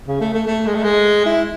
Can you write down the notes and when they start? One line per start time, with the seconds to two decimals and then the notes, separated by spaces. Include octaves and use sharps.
0.07 C#3
0.21 A3
0.34 A3
0.47 A3
0.66 G#3
0.75 A3
0.83 G#3
1.25 E4